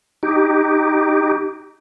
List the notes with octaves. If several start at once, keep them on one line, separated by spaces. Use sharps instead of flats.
D#4 G4